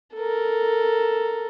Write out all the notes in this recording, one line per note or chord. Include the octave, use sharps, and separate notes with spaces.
A4 A#4